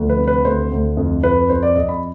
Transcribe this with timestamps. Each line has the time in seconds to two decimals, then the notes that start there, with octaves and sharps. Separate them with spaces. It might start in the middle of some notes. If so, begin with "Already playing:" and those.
Already playing: D2 F3
0.09 B4
0.18 C3
0.28 B4
0.45 D2 C5
0.72 D2
0.97 F2
1.23 F2 B4
1.49 F2 C5
1.63 D5
1.75 F2 D#5
1.89 B5